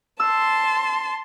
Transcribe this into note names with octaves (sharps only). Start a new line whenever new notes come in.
A5 C6 E6